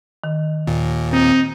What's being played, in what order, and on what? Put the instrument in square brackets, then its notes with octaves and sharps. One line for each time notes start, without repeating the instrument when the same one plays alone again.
[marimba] D#3
[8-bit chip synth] D#2 A#2
[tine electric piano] C4 [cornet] D#4